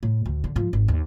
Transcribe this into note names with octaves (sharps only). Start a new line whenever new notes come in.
A2
D2
D3
G#2 F3
G#1
D#2